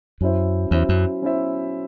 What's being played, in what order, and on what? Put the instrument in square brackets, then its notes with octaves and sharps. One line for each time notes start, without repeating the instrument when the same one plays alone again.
[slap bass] F#2 [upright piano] F#3 C#4 E4 C5 E5
[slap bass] E2 [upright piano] F#3 C#4 E4 C5 E5
[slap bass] F#2
[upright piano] F#3 C#4 E4 C5 E5